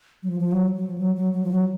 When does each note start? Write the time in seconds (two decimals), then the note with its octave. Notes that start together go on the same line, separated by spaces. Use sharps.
0.23 F#3
0.28 F3
0.40 F3
0.52 F#3
0.75 F#3
0.87 F3
0.98 F#3
1.17 F#3
1.33 F#3
1.44 F3
1.51 F#3